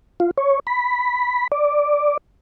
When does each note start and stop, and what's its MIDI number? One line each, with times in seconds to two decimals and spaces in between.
0.20 0.31 65
0.38 0.60 73
0.67 1.47 83
1.52 2.17 74